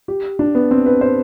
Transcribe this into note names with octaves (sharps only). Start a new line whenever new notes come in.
G4
D4
B3
C4
B4
C5